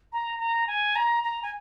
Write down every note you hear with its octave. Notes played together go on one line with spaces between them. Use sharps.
A#5
A#5
G#5
A#5
A#5
G#5